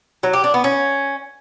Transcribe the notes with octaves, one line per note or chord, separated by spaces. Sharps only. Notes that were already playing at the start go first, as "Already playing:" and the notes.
F#3
G4
D4
B3
C#4